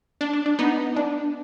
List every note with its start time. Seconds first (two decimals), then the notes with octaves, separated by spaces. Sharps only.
0.21 D4
0.33 D4
0.46 D4
0.59 B3 D#4
0.96 D4